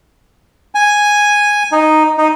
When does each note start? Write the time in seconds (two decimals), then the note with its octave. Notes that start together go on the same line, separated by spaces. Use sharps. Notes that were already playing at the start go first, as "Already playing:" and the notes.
0.75 G#5
1.72 D#4
2.18 D#4